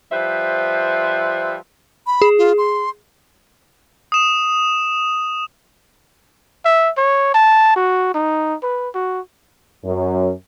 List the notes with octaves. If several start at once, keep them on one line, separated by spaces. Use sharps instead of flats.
F3 G3 B4 C5 E5
B5
G#4
F4
C6
D#6 E7
E5
C#5
A5
F#4
D#4
B4
F#4
F#2